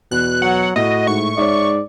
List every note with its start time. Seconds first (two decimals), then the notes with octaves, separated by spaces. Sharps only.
0.11 E2 B2 F#6
0.42 F#3 F#5
0.76 A2 E4 F#4 D#5
1.07 G#2 C#6
1.37 G#2 C#5 D5 E5